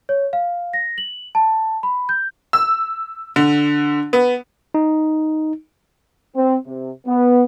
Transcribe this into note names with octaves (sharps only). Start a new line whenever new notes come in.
C#5
F5
A#6
F#7
A5
B5
G6
E6
D3
B3
D#4
C4
C3
B3